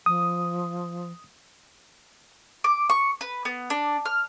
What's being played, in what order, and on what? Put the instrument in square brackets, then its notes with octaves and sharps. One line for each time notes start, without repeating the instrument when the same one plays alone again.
[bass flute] F3 [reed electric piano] D#6
[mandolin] D6
C#6
B4
B3
D4
F6